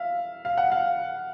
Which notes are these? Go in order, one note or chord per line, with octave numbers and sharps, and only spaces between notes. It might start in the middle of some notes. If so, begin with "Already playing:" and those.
Already playing: E5 F5
F5
F#5
F5